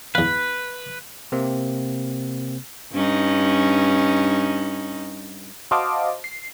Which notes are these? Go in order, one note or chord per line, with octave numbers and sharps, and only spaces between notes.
E2 B4 F5
C3 A#3 C4
G2 C#4 D#4
F#4 C5 D#5 F5 A5 D6
C7